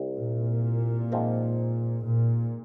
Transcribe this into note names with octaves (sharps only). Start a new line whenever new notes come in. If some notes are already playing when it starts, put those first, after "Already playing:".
Already playing: C2 C3
A#2
G#2 F3 C4
A#2